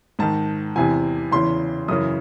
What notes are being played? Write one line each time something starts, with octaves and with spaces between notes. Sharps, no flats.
G#2 D#3 A5
E2 C3 E3 G#5
E2 C#3 E3 C6
F#2 C#3 E3 D#6